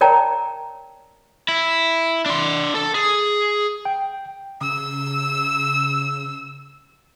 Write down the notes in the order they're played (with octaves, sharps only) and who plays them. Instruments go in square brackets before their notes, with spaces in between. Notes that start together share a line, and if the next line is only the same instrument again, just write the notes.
[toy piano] A#4 C#5 D5 G5 A5 A#5
[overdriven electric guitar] E4
D4 C6
A4
G#4
[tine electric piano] G5
[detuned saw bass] C#3 [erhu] E6